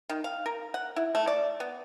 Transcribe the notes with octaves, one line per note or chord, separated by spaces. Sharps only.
D#3
F5
A#4
F#5
E4
A3
D5
B3